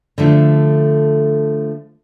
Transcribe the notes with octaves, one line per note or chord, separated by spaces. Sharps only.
D3 F3 A3